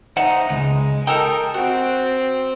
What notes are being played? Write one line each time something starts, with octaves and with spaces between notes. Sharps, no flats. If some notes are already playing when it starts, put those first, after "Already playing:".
D#4 C5 E5 F#5
C#2 G#3
D#4 A4 A#4 G5
C4 F#4